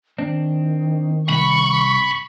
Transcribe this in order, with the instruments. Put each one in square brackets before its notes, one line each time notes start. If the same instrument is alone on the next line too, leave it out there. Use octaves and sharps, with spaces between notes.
[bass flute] D#3 [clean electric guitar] C4 D4
[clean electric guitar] C2 [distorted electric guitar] B5 [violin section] C#6